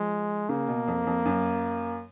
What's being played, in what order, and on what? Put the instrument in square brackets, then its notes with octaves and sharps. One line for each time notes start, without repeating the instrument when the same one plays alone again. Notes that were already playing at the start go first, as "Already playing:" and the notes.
Already playing: [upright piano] F3 [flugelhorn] G#3
[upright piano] C#3 [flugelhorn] A#3
[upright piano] B2
F2
F2
F#2